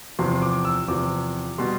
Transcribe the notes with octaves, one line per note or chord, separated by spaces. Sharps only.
E2 C3 F3 C6
D6
E6
E2 C3 F3 D6
B2 G3 C6